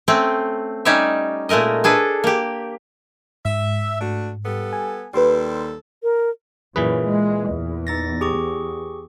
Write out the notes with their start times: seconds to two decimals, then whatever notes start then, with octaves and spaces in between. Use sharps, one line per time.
0.08 A3 C4 C#4 G5
0.85 G3 C#4 D#4 C#5 D5 E5
1.49 A#2 G#3 A3 A#4 D#5
1.84 D4 G#4 A4 B4
2.24 A#3 G4
3.45 G#2 E5
4.01 A3 D4 F#4
4.46 G3 B3 A4
4.73 G#5
5.14 D#2 G3 A4 B4 C6
6.03 A#4
6.76 F#2 A#2 E3 G#4 B4
7.06 G#3
7.52 E2
7.87 D#4 A6 A#6
8.21 G4 G#4 C#6